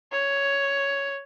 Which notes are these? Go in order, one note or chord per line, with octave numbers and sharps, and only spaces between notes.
C#5